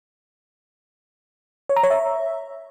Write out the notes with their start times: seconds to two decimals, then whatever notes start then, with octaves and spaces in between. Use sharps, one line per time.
1.69 C#5
1.76 A#5
1.83 C#5
1.90 E5